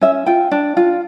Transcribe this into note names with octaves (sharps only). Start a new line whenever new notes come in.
C#4 E5
F4 G5
D4
F4